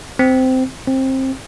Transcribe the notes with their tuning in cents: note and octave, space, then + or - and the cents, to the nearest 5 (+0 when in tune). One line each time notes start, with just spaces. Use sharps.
C4 -15
C4 +20